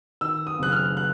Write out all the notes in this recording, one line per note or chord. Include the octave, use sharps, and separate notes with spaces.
D#3 E6
D#6
F#1 F#6
F6
F#6